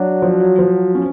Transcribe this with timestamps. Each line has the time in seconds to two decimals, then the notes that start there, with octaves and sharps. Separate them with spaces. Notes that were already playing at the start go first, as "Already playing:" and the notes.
Already playing: F#3 D4
0.22 F3
0.59 F3
0.95 C#4